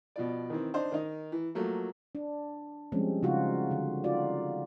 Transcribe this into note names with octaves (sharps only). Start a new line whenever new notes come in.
B2 F3 D5
D#3 E3 C4
D4 D#4 C5
D#3 D#4
E3
F3 F#3 A3 A#3
D4
F3 G3 G#3 C4 C#4
C#3 G3 D#4 F4 F#4
D3
D#4 F4 F#4 D5